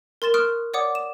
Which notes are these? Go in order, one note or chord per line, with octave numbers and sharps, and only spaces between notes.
A#4 C6 A6 E7
C6 C#6 D#6 F6 F#6 D7
C#5 D5 F#5 D6 D#6
E7